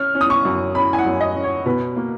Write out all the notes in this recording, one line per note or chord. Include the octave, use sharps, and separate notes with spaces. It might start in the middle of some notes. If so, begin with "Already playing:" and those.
Already playing: C#4 F6
C#4
D#6
C#6
F#2
C#4 B5
G#5
F#5
F#2
D#5
C#4
C#5
B2 B4
A#3